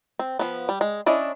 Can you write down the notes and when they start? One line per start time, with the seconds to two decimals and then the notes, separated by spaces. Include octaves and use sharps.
0.19 C4
0.39 F3 B3
0.69 G3
0.81 G#3
1.06 C#4 D4 E4 D5 D#5